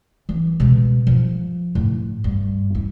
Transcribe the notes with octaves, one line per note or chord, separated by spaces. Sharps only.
E3
B2 G#3
F3
A2
G2
E4